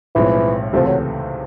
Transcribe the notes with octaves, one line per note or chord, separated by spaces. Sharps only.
B1 A2 E3 F3 G#3 C4
C#2 C3 E3 F3 A3 C4
F#3